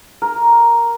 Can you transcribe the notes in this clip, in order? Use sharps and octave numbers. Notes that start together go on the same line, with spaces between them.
A#4